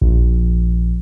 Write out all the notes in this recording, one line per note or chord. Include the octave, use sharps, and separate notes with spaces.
A#1